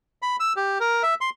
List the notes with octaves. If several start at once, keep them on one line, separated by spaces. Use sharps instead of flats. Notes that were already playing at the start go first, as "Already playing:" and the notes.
B5
E6
G4
A#4
E5
C6